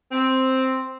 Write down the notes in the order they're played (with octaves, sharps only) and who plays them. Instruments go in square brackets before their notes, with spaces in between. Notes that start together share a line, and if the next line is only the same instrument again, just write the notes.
[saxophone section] C4